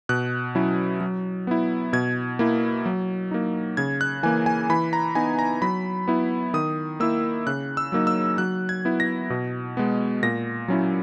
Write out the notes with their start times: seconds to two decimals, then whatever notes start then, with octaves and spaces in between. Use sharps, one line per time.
0.09 B2 F#6
0.55 F#3 C#4 E4
1.01 F#3
1.47 B3 E4
1.93 B2 G#6
2.39 A#3 E4
2.86 F#3
3.31 A#3 D#4
3.77 C#3 G#6
4.01 F#6
4.23 E3 A#3 G#5
4.46 G#5
4.69 E3 B5
4.93 A#5
5.15 B3 D#4 G#5
5.39 A#5
5.62 F#3 B5
6.08 B3 E4
6.54 D#3 D#6
7.00 A#3 E4 E6
7.47 C#3 F#6
7.77 E6
7.92 F#3 A#3 D#4
8.07 E6
8.38 F#3 F#6
8.69 G#6
8.85 B3 E4
9.00 A#6
9.30 B2
9.77 G#3 B3
10.23 A#2 A#6
10.68 F#3 C#4 E4